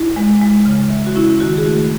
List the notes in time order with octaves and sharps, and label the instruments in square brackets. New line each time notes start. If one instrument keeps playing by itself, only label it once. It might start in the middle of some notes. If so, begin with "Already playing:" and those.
Already playing: [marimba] E4
G#3
G#3
C#3
E3
F#4
C#4 E4
E4
D#3 F#4
G#4
A3 F#4